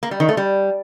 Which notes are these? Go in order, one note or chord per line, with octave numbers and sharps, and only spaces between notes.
A#3
G3
D#3
A3
G3